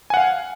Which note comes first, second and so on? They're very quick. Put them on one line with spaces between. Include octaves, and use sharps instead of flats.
G#5 F#5 F5